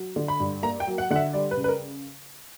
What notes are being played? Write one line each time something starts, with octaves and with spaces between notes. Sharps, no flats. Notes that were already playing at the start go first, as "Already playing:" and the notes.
Already playing: F#3
D3
B5
G2
A#3 A#5
G5
F#3
F#5
D3 F#5
E5
G3 D5
B4
C#3
B4
A#4